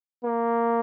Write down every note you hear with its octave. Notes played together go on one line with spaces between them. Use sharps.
A#3